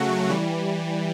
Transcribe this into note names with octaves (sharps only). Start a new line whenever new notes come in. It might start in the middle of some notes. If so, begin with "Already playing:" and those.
Already playing: C#3 F#3 A3 F#4
E3 G3